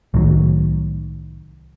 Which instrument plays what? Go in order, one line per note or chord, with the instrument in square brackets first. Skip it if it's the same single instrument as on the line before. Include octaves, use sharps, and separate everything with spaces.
[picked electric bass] C2 A2 D#3 F#3